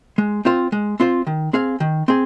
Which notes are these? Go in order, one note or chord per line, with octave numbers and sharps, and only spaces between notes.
G#3
C4 F4 C5
G#3
C4 F4 C5
D#3
C4 G#4 F5
D#3
C4 G#4